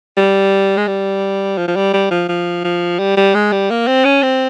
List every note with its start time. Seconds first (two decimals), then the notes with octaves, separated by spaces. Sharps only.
0.17 G3
0.77 G#3
0.87 G3
1.58 F3
1.68 F3
1.76 G3
1.93 G3
2.11 F3
2.29 F3
2.64 F3
2.99 G3
3.17 G3
3.34 G#3
3.52 G3
3.70 A#3
3.87 C4
4.05 C#4
4.22 C4